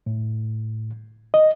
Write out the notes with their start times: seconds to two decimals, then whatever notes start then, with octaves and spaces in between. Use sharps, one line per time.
0.06 A2
1.34 D#5